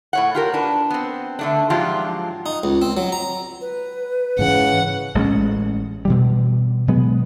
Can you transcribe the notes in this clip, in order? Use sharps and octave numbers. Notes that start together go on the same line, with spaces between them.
A2 C#5 F#5
F4 G4 A#4
D4 B4
B3 C4
D3 A3 D4
G#2 F3 F#3 D4 F4 G4
D#4
C#2
C4
F#3
A#5
B4
G#2 C#3 E3 F#5
A1 G#3 A3 C#4
B2 E3 G3
B2 F#3 G#3 B3